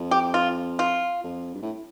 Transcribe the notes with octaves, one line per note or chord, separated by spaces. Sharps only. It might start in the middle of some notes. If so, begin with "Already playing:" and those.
Already playing: F2
G4
F4
F4
F2
G2
A2